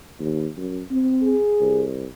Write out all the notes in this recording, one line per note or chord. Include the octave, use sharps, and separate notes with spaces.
D#2
F#2
C4
G#4
C2